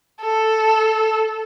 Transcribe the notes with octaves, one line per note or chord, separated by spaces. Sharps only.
A4